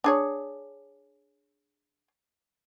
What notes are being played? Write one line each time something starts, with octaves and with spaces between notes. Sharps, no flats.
D4 G#4 C#5